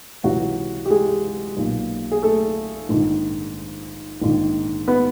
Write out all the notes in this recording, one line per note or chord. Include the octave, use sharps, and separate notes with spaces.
C#2 C3 E3 F#3 F#4
G4
G#3 G#4
B1 A#2
G#4
A3 A4
A#1 G#2 D#3
A#1 G#2 D#3
B3 B4